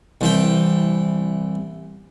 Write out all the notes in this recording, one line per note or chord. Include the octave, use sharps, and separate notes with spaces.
C2 E3 G5